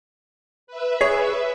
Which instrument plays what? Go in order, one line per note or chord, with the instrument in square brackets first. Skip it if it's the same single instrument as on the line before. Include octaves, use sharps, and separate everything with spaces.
[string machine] B4 E5
[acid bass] G#4 [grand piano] C#5